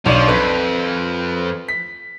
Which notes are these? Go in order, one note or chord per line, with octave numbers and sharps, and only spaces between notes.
B1 F3 D4 D#7
F2 B4
B6